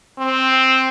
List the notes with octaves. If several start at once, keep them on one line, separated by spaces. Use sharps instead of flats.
C4